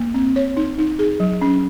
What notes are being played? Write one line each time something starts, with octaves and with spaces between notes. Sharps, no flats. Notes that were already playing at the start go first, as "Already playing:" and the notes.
Already playing: A#3
C4
C#5
D#4
D#4
G#4
F#3
C#4